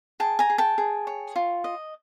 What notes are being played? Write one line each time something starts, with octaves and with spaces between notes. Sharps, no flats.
G#4 G5 A5
G#5 A#5
G#4
G5 A5
G#4
C#5
F4
D#5